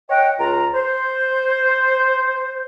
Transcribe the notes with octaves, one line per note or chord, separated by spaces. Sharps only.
C#5 D#5 F#5 G5
C#2 F4 A#5
C5